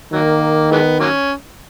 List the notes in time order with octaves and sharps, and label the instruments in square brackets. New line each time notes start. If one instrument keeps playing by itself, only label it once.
[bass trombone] D#3 [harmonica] F#3 A#3
[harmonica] E3 G#3 B3
F#3 A#3 C#4